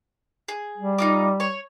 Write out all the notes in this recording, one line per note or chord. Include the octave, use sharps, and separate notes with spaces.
G#4
G3
D#4 F4 D6
C#5 C#6